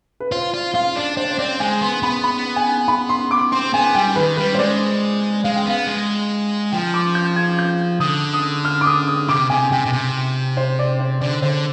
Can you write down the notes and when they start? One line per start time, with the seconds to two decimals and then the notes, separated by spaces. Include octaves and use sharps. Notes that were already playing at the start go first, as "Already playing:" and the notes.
0.20 B4
0.31 F4 C5
0.53 F4 D5
0.74 F4 F5
0.96 D4 D5
1.17 D4 C5
1.31 C5
1.39 C4 D5
1.60 G#3 G#5
1.81 B3 C6
2.03 B3 B5
2.24 B5
2.56 G#5
2.88 B5
3.09 C6
3.31 D6
3.52 C4 C6
3.73 B3 G#5
3.95 G3 G5
4.16 D#3 B4
4.37 G3 B4
4.55 C5
4.59 G#3 D5
5.44 G#3 F5
5.56 G5
5.66 B3 F5
5.87 G#3
6.72 F3 G5
6.94 D6
7.15 G6
7.36 G#6
7.59 G6
8.00 D3 D#6
8.33 D#6
8.65 F6
8.81 D6
8.86 D#6
9.08 D#6
9.29 C3 D6
9.50 C3 G#5
9.71 C3 G5
9.85 B2
9.93 C3
10.57 C5
10.79 D5
10.99 C5
11.21 D3 D5
11.42 D3 C5